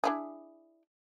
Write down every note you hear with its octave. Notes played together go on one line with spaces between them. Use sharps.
D4 E4 G#4